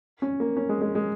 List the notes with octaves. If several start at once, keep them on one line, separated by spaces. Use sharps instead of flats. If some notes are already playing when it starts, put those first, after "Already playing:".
C#4
A#3
C#4
G#3
G#3
G#3